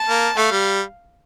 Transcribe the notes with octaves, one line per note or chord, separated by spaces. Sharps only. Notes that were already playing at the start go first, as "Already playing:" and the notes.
Already playing: A5
A#3
A3 F5
G3